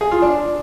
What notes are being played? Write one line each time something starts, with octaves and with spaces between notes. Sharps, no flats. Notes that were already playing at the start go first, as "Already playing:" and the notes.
G#4
F4
D4